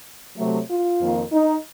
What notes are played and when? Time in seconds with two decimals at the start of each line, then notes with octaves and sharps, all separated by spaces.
0.37 C3 F#3 A3
0.69 F4
1.01 F2 D#3 A#3 D#4
1.32 D#4